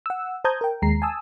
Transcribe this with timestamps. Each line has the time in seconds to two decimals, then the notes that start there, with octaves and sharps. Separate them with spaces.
0.06 F#5 E6
0.44 C5 A5 A#5 D#6 G6 G#6
0.61 A#4 G5
0.82 D#2 G#3 A#5 C7
1.02 G#5 A5 D#6 E6